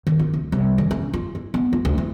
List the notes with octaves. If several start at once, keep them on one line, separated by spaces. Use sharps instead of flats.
D#3
F4
D2
C2
D#3
C#4
F4
E4
B3
F4
D2
E4